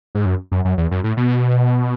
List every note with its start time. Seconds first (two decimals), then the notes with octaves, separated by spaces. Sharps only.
0.15 G#2
0.26 F#2
0.52 F#2
0.65 F#2
0.78 E2
0.91 F#2
1.04 A2
1.17 B2